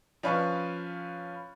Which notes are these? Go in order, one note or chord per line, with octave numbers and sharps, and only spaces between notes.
F3 C#4 B4 F5 C#6